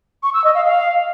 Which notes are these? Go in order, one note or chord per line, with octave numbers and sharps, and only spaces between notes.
C#6
E6
D#5
F5
F5